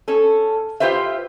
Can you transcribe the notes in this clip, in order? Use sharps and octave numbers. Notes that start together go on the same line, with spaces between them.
C#4 A4
F4 G4 B4 C5 E5